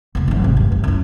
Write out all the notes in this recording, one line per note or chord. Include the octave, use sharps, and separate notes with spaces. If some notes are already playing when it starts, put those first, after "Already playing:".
E1 C#2
G#1 F#3
C3
F1 G2
G2
F#2 E4